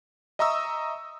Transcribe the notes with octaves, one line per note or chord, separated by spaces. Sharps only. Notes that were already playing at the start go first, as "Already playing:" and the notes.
D#5 E5 A#5 C#6 D#6 E6